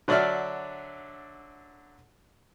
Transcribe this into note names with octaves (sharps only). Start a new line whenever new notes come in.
D3 F#3 D4 D5 E5 F6